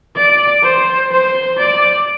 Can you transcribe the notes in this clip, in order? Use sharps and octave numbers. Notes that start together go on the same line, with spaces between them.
D5
C5
C5
D5